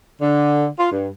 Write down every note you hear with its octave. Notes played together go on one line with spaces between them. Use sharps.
D3
F4
G2